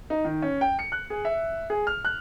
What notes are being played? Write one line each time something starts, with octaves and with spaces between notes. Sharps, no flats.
D#4
D#3
C#4
G5
C#7
F#6
G#4
E5
G#4
F6
F#6